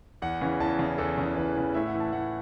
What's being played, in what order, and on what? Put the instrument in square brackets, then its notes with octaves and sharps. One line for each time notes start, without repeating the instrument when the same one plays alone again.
[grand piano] E2 F#5
C#3 E3
E2 A5
C#3 E3
E2 A4
C#3 E3
E2 B4
C#3 E3
A2 E5
F#5
E3
A5
A2 F#5